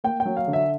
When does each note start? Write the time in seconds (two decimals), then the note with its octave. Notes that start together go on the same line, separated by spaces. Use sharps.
0.04 A#3 G5
0.20 G5
0.25 F#3
0.37 F5
0.48 D3
0.53 E5